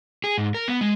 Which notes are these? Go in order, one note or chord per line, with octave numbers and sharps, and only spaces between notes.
G#4
G#2
A#4
B3
G#3